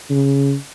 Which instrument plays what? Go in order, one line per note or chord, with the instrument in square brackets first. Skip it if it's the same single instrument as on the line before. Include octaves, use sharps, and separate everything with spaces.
[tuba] C#3